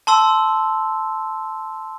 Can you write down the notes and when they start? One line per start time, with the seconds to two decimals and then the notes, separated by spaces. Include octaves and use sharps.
0.07 A5 C6 E6